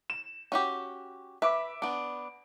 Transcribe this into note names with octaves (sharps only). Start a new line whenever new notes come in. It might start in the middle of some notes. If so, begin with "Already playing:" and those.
E7
C#4 F#4 G4
B4 E5 D6
B3 D4 D7